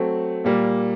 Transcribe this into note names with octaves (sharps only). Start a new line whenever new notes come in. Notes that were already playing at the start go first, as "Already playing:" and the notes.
Already playing: F#3 A3 C4
A#2 G3 A#3